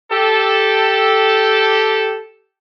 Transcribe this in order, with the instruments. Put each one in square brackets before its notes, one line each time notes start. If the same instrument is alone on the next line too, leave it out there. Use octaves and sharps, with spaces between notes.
[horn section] G4 A4